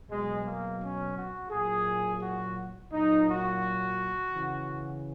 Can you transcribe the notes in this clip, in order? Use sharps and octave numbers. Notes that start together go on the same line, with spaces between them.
B2 F#3 G#3
A#3
C#4
F#4
A#2 F#3 G#4
F#4
A#2 F#3 D#4
F#4
C#3 E3